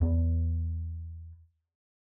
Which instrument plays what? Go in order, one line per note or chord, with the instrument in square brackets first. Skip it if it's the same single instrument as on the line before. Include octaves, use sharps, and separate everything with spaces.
[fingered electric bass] E2 B3